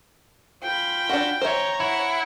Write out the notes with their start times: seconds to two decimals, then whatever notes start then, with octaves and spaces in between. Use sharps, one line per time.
0.64 F4 G5 B5
1.09 D4 F#4
1.41 C5 C#5 E5 A#5
1.80 E4 F#5